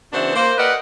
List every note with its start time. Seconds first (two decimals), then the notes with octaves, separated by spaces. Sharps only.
0.12 C#3 E3 B3 D4 F#4 C5
0.34 A#3 C5
0.57 G4 A#4 B4 D5 D#5 F#5